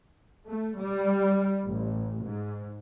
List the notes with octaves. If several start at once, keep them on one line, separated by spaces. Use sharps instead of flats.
A3
G3
A1
G#2